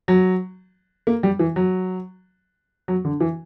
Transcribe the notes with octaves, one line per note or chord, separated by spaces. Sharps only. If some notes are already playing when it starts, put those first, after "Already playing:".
F#3
A#3
G3
E3
F#3
F#3
D3
E3